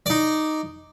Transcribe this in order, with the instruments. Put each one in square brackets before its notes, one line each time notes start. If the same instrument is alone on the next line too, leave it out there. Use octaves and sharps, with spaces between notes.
[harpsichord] D#4 D5